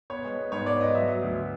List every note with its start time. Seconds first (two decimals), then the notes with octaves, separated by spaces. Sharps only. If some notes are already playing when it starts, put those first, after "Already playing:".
0.10 B3 C#5
0.25 G#3
0.38 B3
0.52 G#2 C#5
0.66 B3 D5
0.80 B3 D#5
0.94 F#3 E5
1.08 F#3
1.23 D2